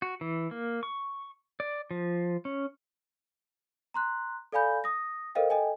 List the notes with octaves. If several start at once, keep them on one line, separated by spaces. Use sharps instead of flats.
F#4
E3
A#3
C#6
D5
F3
C#4
A#5 C6 F#6
A4 D5 F5 G#5 B5 G6
D#6 A#6
A4 A#4 C5 D#5 F5 G5
A4 D#5 G5 G#5